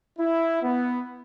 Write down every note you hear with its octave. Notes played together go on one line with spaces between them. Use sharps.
E4
B3